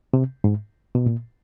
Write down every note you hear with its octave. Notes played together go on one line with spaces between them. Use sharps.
C3
G#2
B2
A#2